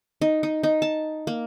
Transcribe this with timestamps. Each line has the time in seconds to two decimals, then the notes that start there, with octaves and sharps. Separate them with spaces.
0.21 D#4
0.43 D#4
0.63 D#4
0.82 A5
1.27 A#3